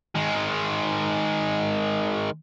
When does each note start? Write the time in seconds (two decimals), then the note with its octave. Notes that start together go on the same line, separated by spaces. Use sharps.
0.15 D#3 G#3